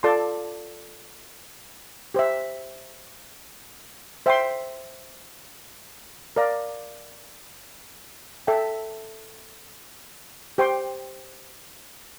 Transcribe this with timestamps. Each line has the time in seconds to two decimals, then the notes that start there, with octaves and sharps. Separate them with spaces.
0.03 F4 A4 D5 A5 C6
2.14 G4 C5 E5
4.26 C5 E5 G5 C6
6.36 A#4 D5 F5 A#5
8.47 A4 E5 G5
10.58 G4 C5 G5 C6